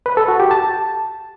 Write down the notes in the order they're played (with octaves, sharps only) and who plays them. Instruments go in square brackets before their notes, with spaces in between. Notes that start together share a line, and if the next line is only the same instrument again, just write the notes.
[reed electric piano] B4
A4
F#4
G4
A5